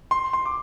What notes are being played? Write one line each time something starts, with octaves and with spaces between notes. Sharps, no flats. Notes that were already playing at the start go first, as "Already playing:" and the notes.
C6
C6
D6